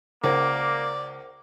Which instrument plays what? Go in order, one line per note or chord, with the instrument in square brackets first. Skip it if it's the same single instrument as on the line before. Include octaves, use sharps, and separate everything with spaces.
[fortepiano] C#2 [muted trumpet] A#3 [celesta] A#4 C5 F#5 [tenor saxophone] D5